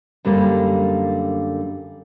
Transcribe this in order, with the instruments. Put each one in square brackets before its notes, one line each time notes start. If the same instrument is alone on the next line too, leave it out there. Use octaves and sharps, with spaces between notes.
[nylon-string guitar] F#2 D3 G3 A#3